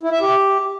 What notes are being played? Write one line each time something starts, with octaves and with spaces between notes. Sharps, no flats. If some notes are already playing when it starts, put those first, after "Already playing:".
E4
E5
G4